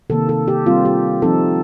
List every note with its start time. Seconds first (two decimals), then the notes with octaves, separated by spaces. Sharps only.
0.10 C3 D#3 A#3 A4
0.29 A4
0.48 G4
0.66 G3 C4 F4
0.85 G4
1.22 F3 C4 D#4 A4